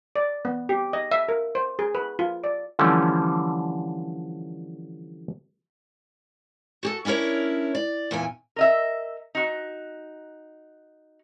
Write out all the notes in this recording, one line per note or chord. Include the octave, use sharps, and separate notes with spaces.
D5
B3
G4
D#5
E5
A#4
C5
G#4
B4
F4
D5
D3 E3 F3 G3 A3 C#4
F#4 G4 A4
C#4 D4 E4 A#4 C#5
D5
E2 A#2 G5 G#5
A#4 D#5 E5
D#4 F#4